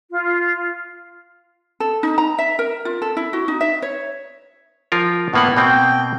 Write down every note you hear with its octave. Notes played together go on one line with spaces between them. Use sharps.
F4
A4
D#4
A#5
E5
A#4
F4
A4
E4
F#4
D#4
E5
C#5
F3 F4 A#4
A2 A#3 B3 F#5
B2 A#3 C4 G5